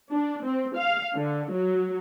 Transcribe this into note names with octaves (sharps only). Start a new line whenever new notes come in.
D4
C4
F5
D3
F#3